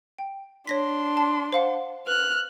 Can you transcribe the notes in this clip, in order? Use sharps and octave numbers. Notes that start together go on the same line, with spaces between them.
G5
D4 C#5 C6 A#6 B6
A5
C5 F5 F#5
B4 F6 F#6